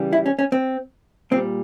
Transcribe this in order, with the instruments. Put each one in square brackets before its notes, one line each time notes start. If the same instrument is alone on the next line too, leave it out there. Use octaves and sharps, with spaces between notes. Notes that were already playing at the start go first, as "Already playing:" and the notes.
Already playing: [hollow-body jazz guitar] C#3 E3 G3
E4
C#4
C#4
C4
A#2 C4
G3